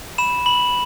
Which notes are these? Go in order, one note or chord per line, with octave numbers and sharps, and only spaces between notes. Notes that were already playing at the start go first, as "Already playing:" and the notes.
B5 E7
B5 F#7